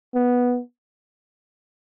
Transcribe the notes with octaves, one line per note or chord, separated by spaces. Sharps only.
B3